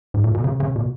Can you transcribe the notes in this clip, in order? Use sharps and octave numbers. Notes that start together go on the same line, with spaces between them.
G#2
A#2
B2
C#3
C#3
B2